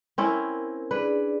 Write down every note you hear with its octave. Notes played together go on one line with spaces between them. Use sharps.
C4 C#4 E4 A#4
D4 G#4 B4 D5